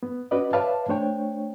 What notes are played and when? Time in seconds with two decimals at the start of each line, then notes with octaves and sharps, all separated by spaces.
0.03 B3
0.31 C#4 F#4 B4 D5 D#5
0.53 B4 C#5 D5 E5 F5 A5
0.89 A3 D4 C5 C#5 G5